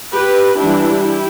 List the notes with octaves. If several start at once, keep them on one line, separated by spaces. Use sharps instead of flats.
G4 B4
E3 G3 D4 E4 G4